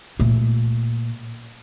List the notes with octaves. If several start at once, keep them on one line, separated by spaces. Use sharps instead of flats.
A#2 A3